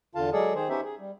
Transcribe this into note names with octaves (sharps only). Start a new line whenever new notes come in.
E2 D3 F4 F5 A5
F#3 G#3 G#4 A4 D5
D#3 G#4 C5
B3 C#4 D#4 G4 C5 E5
G#4
G3